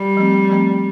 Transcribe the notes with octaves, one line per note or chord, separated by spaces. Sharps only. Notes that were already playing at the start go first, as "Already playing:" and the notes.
Already playing: G3
F3 A3 C4
F3 A3 C4